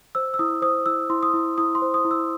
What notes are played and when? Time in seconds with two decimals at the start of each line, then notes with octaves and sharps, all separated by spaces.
0.15 C5 E6
0.34 E6
0.39 E4 D#6
0.62 C5 D#6
0.86 E4 E6
1.09 E4 C6
1.23 D#6
1.34 E4
1.58 E4 D#6
1.75 C6
1.82 C5
1.94 D#6
2.05 E4
2.11 E6